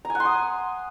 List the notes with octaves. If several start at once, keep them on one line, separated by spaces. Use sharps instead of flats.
A#5
G#5
F#5
C6
D#6